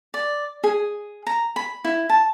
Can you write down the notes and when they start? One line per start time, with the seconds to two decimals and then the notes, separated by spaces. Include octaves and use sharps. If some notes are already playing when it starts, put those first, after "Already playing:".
0.14 D5
0.64 G#4
1.27 A#5
1.56 B5
1.85 E4
2.09 A5